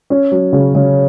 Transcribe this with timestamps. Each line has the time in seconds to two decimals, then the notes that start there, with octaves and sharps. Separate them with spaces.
0.10 C#4
0.31 F#3
0.53 C#3
0.75 C#3